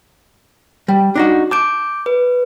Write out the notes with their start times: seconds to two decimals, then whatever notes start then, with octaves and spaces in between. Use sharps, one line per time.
0.88 G3
1.15 D4 D#4 F#4
1.51 A5 D6 G6 D7
2.06 B4